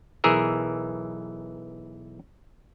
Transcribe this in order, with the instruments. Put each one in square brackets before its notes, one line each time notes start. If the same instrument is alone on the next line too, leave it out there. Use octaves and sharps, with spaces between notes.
[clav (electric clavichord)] B1 E3 G#4 A#4 E5